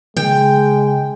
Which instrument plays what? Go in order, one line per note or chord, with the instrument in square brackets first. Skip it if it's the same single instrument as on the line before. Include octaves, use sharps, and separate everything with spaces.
[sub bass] C#3 [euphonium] G#3 [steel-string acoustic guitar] G5